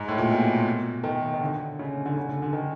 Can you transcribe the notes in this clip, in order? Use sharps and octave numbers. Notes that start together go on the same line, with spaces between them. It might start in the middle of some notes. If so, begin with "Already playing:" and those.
Already playing: G#2
A2
A#2
B2
D#3
D#3
D3
C#3
D3
C#3
D3
D3
D#3